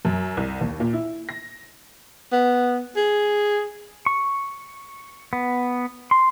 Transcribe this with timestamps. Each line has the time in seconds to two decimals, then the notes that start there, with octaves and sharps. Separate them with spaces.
0.05 F#2
0.37 C2
0.61 D#2
0.80 A#2
0.93 E4
1.29 A#6
2.32 B3
2.96 G#4
4.06 C#6
5.33 B3
6.11 C6